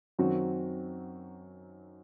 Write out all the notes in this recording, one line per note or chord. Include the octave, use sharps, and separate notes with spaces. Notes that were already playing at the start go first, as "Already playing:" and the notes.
F#2 D#3 F#3 C4 F#4